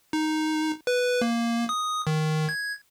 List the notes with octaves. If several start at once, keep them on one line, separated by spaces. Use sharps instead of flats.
D#4
B4
A#3
D#6
D#3
G#6